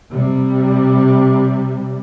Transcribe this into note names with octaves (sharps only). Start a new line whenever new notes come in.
C3 G3